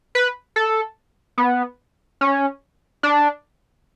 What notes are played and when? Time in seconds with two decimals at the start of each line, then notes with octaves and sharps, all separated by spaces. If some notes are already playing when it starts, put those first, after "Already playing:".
0.15 B4
0.56 A4
1.38 B3
2.21 C#4
3.03 D4